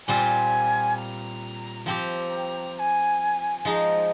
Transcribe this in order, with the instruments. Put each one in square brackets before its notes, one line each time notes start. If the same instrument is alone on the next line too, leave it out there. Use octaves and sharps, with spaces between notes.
[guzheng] A#2 G3 C4 F4 [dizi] G#5
[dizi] A#5
[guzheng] F3 C4 G4 [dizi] A#5
[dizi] A#5
G#5
[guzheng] F3 G#3 D#4